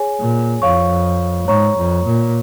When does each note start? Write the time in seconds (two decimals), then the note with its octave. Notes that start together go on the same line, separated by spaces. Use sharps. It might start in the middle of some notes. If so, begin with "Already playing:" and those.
Already playing: G#4 C#5 G#5
0.19 A#2
0.62 F2 C#5 F5 C#6
1.48 G#2 C#5 A#5 C#6
1.77 F2
2.05 A#2